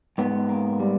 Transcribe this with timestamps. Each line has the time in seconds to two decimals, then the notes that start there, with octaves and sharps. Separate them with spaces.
0.18 G#2 B3
0.49 A#3
0.80 G3